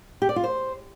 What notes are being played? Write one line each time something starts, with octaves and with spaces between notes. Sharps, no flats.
G4
D5
F4
C5